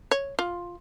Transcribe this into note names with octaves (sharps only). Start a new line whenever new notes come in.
C#5
F4